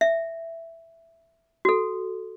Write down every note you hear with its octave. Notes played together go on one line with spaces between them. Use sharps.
E5
F#4 A4